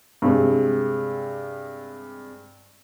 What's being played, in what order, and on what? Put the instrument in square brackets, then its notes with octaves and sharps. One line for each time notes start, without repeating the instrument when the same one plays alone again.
[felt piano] G2 C3 G#3